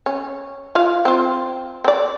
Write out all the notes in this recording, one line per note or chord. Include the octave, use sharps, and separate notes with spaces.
C#4
F4 F5
C4 F4
C4 D5